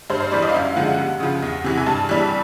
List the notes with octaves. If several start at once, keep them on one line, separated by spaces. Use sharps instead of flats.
G2 C5
C5
E3 G3 D5
D#5
F5
F#2 E5
F5
D3 F3 G#3 F#5
F#5
D#2
C#3 F3
E2
C3 E3
G#5
G2 A5
E3 G3